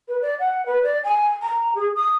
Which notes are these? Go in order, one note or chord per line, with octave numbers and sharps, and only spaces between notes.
B4
D5
F#5
B4
D5
G#5
A#5
G#4
D#6